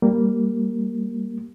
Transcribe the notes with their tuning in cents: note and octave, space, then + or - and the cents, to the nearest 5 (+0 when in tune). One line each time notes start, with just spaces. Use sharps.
G3 +0 A#3 -5